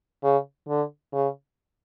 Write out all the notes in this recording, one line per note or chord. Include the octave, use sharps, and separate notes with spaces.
C#3
D3
C#3